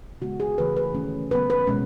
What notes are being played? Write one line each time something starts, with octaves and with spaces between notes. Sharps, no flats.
C#3 G#3 B3 F#4
G#4
C#3 E3 A3 B4
B4
D#3 A3 C#4
C#3 F#3 B3 B4
B4
B2 G#3 C#4